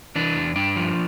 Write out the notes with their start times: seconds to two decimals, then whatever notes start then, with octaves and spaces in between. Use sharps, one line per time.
0.16 E3 D4
0.35 E2
0.56 G2 D4
0.76 F3